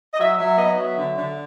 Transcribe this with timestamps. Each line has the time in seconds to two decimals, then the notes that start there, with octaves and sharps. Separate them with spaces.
0.13 D#5
0.19 F#3 E5
0.38 F#3 E5
0.58 B3 D#5
0.72 D#5
0.77 F#3 E5
0.97 D3
1.15 D3